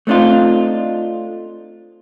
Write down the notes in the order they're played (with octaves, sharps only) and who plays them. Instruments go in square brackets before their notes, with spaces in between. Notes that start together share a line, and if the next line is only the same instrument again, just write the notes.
[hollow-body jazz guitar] A3 C4 D4 D#4 F4